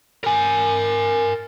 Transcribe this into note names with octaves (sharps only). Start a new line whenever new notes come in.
A#4 G#5